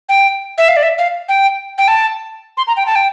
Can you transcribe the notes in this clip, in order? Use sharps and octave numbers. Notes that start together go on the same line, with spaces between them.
G5
E5
F5
D5
E5
F5
G5
G5
A5
C6
A#5
G5
A5
G5